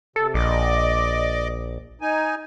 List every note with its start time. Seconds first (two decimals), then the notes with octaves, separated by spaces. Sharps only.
0.16 C3 A4
0.34 A#1 D5 D#5 D6
2.01 D#4 G#5